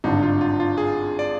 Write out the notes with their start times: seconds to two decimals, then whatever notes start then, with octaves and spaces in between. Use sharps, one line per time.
0.04 G#1 G2 D3 D#4
0.23 F4
0.41 F4
0.60 F4
0.78 G#4
1.19 D5